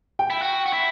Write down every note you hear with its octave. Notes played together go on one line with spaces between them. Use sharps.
G5
E4
F#4
F#4
E4